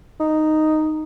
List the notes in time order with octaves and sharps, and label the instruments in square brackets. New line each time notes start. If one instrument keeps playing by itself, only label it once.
[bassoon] D#4